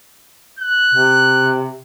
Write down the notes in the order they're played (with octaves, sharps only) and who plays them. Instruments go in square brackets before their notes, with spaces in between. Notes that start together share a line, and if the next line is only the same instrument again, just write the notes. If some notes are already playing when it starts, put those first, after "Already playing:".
[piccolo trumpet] F#6
[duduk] C3